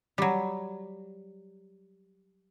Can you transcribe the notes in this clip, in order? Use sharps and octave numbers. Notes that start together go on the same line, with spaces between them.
F#3 G3